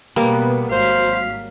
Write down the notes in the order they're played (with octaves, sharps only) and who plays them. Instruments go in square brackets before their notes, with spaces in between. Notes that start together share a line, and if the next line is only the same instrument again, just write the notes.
[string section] B2 B3 [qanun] G3 A#3
[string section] G#1 F#3 B6 [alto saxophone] C5 [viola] F5